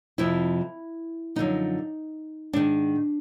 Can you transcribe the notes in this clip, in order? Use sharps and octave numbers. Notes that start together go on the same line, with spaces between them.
F2 C3 F3 E4
F#2 D3 F3 D#4
G#2 D#3 D4